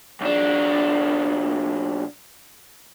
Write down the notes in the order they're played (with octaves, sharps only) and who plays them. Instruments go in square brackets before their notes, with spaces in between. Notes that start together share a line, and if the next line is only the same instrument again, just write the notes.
[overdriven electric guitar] B1 D4